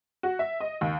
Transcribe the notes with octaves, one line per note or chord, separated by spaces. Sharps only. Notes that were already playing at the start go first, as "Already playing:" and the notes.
F#4
E5
D#5
D#2